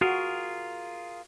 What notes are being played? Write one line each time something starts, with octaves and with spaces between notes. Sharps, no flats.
F4 F#4 G#4 A#4